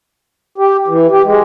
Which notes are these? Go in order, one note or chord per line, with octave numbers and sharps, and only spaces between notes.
G4
E3
G4
G#3